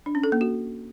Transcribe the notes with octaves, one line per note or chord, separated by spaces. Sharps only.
D4
C#4
A4
A#3
F#4